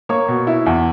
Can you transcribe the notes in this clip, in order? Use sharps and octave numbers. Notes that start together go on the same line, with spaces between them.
A#3 C#5 C#6
B2
E4
E2